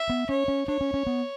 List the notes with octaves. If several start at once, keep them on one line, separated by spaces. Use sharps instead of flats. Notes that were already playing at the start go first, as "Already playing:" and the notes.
Already playing: E5
B3
C#4 C#5
C#4
D4 C#5
C#4
C#4
B3